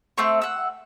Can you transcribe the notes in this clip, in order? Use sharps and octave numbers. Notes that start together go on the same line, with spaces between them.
A3 C4 C#6
F#5 E6